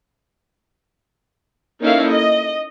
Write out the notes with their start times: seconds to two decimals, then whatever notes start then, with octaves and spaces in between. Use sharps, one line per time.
1.81 A#3 C#4 D#4 E4 A4 F5
2.10 D#5